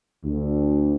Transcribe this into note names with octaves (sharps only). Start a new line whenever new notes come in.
D2